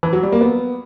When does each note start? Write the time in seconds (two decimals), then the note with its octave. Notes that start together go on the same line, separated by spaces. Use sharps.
0.03 E3
0.13 F#3
0.23 G3
0.32 A#3
0.41 B3